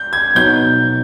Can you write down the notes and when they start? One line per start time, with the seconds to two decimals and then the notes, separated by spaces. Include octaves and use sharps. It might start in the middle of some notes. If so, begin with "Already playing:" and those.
Already playing: G6
0.13 G#6
0.35 B2 F#3 B3 D#4 F#4 G6